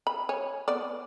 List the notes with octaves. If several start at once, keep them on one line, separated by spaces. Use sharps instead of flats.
B5
C#5 G#5
B3 D5